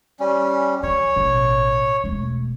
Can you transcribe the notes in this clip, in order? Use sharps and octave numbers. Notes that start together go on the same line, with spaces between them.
G3 C#4
E3 C#5
A1 B2
E1 A3